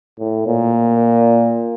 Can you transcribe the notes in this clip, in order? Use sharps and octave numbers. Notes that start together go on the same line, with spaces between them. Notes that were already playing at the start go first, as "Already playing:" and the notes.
A2
A#2